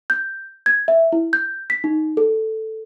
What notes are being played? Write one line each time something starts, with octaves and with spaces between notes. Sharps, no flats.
G6
G#6
E5
E4
G6
B6
D#4
A4